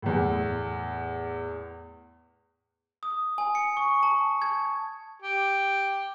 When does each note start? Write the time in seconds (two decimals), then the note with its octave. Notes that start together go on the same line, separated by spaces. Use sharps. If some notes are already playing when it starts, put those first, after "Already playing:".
0.02 E2 A2
3.03 D#6
3.38 G#5
3.55 C#7
3.77 C#6
4.03 A5
4.42 G#6
5.22 G4